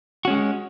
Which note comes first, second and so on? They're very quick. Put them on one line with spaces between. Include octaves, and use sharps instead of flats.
F#4 C#4 G#3